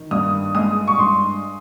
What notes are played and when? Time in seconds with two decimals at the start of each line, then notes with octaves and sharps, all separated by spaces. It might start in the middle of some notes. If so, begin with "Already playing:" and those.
Already playing: D#3
0.11 G2 D#6
0.55 G#3 D#6
0.87 C#6
0.98 G2 C6